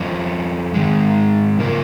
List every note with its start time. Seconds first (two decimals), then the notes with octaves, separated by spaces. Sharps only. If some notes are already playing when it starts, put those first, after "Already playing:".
Already playing: F2 F3 C#4
0.74 G#2 D#3 G#3
1.60 C#3 F3 A#3 A#4